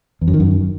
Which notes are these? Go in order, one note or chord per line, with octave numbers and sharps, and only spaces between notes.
E2
F#2
D#3
F#2